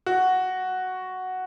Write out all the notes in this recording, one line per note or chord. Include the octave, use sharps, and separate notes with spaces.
F#4